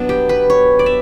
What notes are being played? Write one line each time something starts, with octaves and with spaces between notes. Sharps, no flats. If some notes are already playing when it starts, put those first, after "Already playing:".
Already playing: B2 F#3 B3 D4
G4
B4
C#5
D5
E5